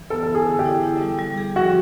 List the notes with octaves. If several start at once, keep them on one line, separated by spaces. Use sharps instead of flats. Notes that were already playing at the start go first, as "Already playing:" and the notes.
Already playing: E3
B3 A4
A4
E4
G#4
D3
G4
E4
E4
G3
G3
G#4
F3 F#4